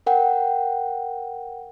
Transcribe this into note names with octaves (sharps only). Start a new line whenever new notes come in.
A#4 F#5 G5